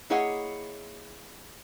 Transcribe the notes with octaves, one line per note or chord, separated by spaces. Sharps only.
A#3 E4 G#4 C#5 D#5 F#5